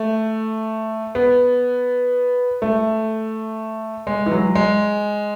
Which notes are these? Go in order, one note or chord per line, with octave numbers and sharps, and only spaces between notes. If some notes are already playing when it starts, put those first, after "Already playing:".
Already playing: A3
B3
A3
G#3
E3
F#3
G#3